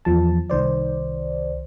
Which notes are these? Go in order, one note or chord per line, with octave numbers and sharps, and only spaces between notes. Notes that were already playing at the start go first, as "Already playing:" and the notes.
E2 F3 A5
C2 D#3 C5 D5